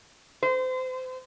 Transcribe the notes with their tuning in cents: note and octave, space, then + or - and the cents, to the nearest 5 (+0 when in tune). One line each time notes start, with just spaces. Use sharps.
C5 -30